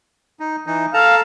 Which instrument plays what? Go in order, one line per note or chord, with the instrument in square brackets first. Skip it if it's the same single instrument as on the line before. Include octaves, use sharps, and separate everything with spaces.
[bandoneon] D#4
E3 D#4
[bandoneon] A4 A5 A#5 [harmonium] F5